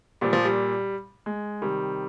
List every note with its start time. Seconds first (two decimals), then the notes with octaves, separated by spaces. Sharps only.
0.21 A#2 F3 G3
0.33 F3
0.45 G3
1.26 G#3
1.62 C3 D#3 G3